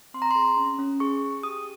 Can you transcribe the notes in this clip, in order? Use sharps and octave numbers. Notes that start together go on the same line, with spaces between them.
C4 C6
A#5
G#4 C6
C#4
C#4
G#4 C#6
G#4
G4 D#6